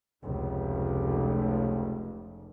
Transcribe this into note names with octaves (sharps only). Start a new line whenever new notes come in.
F1 C#2